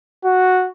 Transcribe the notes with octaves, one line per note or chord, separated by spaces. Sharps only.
F#4